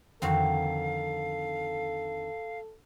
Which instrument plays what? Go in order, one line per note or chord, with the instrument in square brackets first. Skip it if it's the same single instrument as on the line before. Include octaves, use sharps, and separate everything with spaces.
[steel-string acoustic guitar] F2 D3 D#3 [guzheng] C4 F#4 [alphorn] A4 [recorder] F5